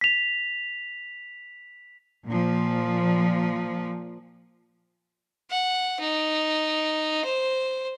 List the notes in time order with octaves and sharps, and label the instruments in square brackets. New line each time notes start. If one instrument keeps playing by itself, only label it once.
[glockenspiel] B6 F7
[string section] A#2 F3
[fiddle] F#5
D#4
C5